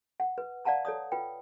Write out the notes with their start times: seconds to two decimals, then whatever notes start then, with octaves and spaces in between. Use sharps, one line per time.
0.20 F#5
0.38 B4
0.65 D5 F5 F#5 A5 A#5 E6
0.85 A4 C#5 D5 D#6
1.12 F4 B4 G5